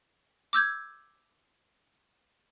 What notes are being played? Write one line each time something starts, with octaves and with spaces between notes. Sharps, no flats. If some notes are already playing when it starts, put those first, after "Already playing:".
D6 E6 G6 G#6